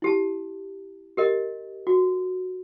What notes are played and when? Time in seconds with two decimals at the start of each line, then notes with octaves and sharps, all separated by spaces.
0.02 E4 G4 A5
1.17 G4 A#4 D#5
1.87 F#4